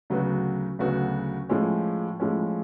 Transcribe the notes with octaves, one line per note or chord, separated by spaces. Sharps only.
D2 C#3 F#3 B3 F#4
D2 C#3 F#3 B3 F#4
A2 F3 G#3 C#4
A2 F3 G#3 C#4